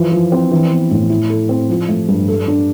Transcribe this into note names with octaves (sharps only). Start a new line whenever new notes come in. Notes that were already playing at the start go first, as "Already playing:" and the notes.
Already playing: E3 F3
F3
C4
E3
B3
A2
E4
A4
C4
F3
A3
G2
A4
D4